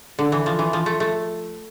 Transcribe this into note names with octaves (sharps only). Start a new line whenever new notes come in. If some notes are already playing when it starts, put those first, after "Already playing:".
D3
E3
F3
E3
F3
A3
A3